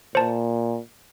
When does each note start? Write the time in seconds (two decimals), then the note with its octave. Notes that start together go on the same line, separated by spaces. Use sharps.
0.15 A#2 C5 A5